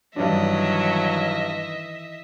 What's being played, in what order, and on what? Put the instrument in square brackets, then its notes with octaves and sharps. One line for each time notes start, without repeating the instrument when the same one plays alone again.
[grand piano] G2 D4 [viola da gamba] D#3 E3 [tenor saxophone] F#3 [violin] D#5 E5